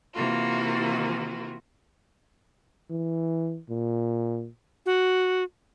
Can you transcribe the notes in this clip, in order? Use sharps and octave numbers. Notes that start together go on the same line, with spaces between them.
C3 E3 A#3 F4 F#4
E3
A#2
F#4